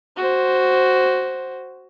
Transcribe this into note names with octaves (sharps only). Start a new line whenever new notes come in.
F#4 C5